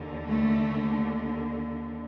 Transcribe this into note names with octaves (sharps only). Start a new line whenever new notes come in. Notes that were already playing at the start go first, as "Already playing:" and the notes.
Already playing: D#2 D3
A3